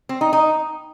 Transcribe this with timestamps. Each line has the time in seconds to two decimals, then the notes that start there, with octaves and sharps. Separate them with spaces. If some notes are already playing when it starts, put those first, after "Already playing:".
0.09 C4
0.21 D#4
0.33 D#4